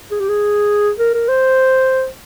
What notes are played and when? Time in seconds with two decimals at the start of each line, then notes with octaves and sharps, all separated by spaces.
0.11 G#4
0.20 G4
0.29 G#4
0.99 A#4
1.14 A#4
1.28 C5